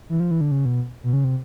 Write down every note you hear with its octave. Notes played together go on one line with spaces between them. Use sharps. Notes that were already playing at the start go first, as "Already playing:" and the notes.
E3
F3
E3
D3
C#3
B2
B2
C#3
C3